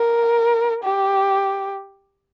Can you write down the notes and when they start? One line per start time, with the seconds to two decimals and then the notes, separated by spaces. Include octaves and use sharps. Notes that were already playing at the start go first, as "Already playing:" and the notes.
Already playing: A#4
0.84 G4